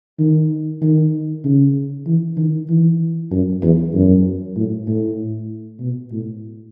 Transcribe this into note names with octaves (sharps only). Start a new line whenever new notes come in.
D#3
D#3
C#3
E3
D#3
E3
F#2
E2
F#2
A2
A2
B2
A2